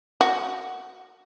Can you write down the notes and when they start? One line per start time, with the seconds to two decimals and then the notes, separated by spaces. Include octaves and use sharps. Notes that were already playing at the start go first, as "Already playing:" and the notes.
0.21 F#4